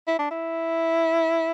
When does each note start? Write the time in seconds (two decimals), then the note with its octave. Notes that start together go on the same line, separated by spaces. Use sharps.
0.08 E4
0.19 D4
0.31 E4